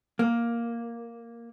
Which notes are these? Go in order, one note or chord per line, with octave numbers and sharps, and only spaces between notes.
A#3